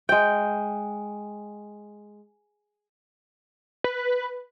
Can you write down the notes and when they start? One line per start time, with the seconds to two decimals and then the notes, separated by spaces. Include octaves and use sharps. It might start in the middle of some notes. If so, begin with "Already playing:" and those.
0.09 G#3 G5
3.84 B4